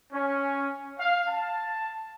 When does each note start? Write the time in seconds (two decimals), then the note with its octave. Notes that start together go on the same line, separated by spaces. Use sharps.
0.12 C#4
0.98 F5
1.28 A5